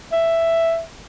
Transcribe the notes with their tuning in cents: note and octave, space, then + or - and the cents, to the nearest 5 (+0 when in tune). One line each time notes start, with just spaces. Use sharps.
E5 +5